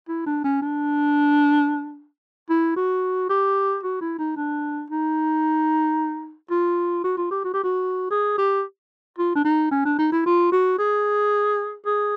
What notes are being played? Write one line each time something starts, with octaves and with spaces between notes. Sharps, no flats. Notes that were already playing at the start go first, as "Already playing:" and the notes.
E4
D4
C#4
D4
E4
F#4
G4
F#4
E4
D#4
D4
D#4
F4
F#4
F4
G4
F#4
G4
F#4
G#4
G4
F4
D4
D#4
C#4
D4
D#4
E4
F4
F#4
G#4
G#4